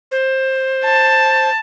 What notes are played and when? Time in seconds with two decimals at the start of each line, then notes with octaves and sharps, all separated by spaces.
0.12 C5
0.85 A5